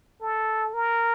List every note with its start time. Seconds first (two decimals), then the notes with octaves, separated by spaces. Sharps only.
0.21 A4
0.74 A#4